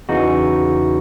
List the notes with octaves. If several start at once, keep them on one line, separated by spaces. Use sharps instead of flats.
E2 C#3 E3 D#4 F#4